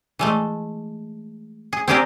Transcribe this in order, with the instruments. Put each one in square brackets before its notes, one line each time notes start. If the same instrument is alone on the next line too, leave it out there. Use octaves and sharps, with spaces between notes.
[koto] E3 G#3 A3
G#4
C4 E4 G4 G#4 A#4 D5